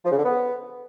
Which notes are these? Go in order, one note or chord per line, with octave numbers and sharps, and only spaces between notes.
F3
C#3
D3
B3